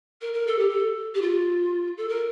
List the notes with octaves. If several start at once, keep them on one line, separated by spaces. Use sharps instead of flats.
A#4
A#4
A4
G4
A4
G4
F4
A4
A#4